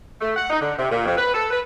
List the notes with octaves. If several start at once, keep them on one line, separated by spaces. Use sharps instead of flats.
A3
F#5
D#4
D3
C3
A#2
F2
B4
A4
B4